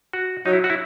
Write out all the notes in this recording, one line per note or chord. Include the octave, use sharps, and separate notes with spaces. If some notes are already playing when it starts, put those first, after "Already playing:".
F#4
F#3 D#4
E4
F#4
E4